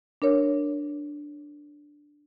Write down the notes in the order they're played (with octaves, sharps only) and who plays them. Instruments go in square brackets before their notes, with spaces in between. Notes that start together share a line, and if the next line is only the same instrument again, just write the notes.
[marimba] D4 A#4 C#5